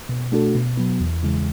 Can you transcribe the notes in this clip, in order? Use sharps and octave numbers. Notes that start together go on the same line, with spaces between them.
B2
A3 D4 F#4 A4
B2
F#3 B3
E2
C#3 E3 G#3